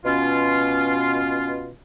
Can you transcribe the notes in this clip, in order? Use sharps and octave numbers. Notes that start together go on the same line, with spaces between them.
B2 C#4 F4